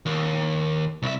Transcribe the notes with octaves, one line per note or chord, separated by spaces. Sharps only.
D#2
C2 E5